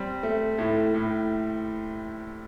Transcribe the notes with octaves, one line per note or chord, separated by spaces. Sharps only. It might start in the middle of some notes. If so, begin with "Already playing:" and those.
Already playing: G3 C4
A3
A2
A2